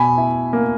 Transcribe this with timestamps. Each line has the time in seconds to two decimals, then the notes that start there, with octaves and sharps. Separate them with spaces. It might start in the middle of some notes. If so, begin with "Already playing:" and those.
Already playing: B2 G#5 B5
0.18 E4
0.53 A#3